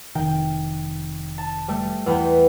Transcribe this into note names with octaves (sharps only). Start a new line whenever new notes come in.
F1 D#3 G5
A5
G3 A3
E2 B4 G5